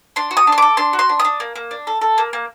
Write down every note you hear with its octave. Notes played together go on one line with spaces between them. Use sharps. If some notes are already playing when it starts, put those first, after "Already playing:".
D4 C6
F#4
D#6
D4
C6
A4 D6
D4 C6
F#4
C6
D4
D#6
D4
A#3
A#3
D4
A4
A4
A#3
A#3